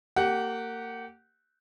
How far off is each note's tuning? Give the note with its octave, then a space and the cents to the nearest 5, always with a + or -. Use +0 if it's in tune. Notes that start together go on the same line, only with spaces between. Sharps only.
A#3 -30 G4 -20 F#5 +0